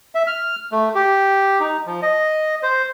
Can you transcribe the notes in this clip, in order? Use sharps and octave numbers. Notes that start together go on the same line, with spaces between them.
E5
F6
A3
G4
D#4
F3
D#5
C5